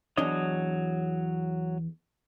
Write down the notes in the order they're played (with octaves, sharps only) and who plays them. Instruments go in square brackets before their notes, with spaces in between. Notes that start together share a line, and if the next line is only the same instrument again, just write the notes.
[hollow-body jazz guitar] E2 D4 D#5 [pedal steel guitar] F#3 C#5 D#6